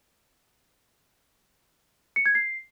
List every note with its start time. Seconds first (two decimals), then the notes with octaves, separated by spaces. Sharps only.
2.16 C#7
2.26 G#6
2.35 C7